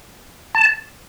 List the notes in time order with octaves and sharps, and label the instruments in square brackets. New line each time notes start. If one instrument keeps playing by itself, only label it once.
[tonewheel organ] A5